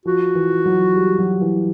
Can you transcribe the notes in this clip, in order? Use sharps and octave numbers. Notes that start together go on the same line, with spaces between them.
F3 F#4
E3
F#3
G3
F#3
E3